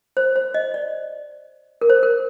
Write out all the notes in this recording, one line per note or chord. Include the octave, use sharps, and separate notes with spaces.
C5
C5
D#5
D5
A#4
C5
A#4